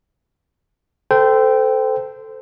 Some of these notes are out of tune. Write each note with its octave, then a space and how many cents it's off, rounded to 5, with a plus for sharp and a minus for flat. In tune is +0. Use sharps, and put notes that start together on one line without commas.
A4 +0 C5 -25 G5 +0